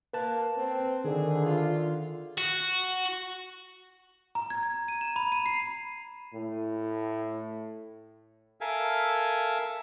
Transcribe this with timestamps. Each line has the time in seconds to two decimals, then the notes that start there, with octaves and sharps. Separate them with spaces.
0.13 A#3 B4 A5 F#6
0.58 C4
1.05 D3 D#3 G#4
1.46 F4
2.38 F#4
4.35 A#5
4.50 G#6
4.63 G#6
4.88 D#7
5.01 E7
5.16 B5
5.32 D#7
5.46 C7
6.34 A2
8.61 A4 A#4 E5 F5 G#5